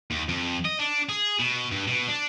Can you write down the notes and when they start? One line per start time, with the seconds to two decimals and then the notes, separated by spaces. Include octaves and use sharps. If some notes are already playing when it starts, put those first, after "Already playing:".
0.11 D#2
0.29 F2
0.65 D#5
0.79 D4
1.09 G#4
1.39 B2
1.71 G2
1.88 B2
2.07 D4